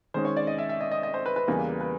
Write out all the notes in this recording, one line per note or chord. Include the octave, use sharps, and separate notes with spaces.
D#3 G#3 C#4 C5
C#5
D5
D#5
E5
E5
D#5
D#5
D#5
C5
B4
B4
E2 C#3 E3 G3 A#3
B4